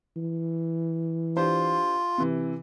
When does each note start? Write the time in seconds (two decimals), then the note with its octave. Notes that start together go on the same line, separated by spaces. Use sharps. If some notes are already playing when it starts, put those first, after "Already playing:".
0.17 E3
1.37 D4 F4 G4 C5
2.18 C3 E3